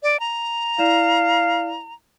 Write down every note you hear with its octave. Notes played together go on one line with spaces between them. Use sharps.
D5
A#5
E4 D5 F5 E7